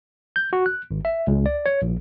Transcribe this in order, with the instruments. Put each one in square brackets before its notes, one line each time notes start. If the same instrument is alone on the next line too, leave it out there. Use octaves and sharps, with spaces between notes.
[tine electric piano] G6
F#4
F#6
G#1
E5
C#2
D5
C#5
A#1